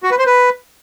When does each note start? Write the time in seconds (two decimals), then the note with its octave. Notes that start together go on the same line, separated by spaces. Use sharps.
0.03 F#4
0.11 B4
0.18 C5
0.26 B4